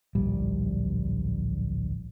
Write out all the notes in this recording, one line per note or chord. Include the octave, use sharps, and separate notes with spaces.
D1 A#1 G3